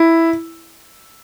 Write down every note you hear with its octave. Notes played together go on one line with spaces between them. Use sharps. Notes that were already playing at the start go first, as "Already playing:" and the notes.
Already playing: E4